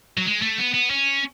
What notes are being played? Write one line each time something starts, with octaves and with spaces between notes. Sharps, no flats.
F#3
G#3
A3
B3
B3
C#4